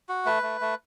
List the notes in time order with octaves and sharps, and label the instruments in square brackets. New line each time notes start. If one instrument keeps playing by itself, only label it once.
[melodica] F#4
A3 B4
A3
A3